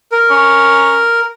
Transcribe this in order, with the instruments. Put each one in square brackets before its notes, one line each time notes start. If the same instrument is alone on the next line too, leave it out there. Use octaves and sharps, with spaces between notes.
[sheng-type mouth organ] A#4
[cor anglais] C#4